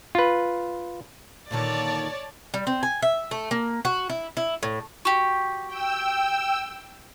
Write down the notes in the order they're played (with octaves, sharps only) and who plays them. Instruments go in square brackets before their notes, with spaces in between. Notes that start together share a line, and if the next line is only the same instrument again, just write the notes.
[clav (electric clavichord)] F4 B4
[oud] A#2 D3 D#3 [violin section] C#5 D5 A5
[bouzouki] G3
C4
G#5
E5
A3
A#3
F#4
E4
E4
A2
[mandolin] F#4 G4
[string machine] G5 E6